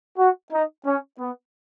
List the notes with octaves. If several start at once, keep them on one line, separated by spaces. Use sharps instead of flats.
F#4
D#4
C#4
B3